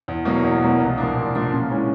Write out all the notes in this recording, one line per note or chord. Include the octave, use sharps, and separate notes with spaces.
E2
B2 F#3 A#3
E2
B2 F#3 A#3
C2
A#2 F3 A#3 D4
C2
A#2 F3 A#3 D4
C#3
E3 G#3 C#4